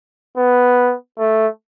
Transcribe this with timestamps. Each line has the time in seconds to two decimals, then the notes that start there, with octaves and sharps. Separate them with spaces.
0.38 B3
1.19 A3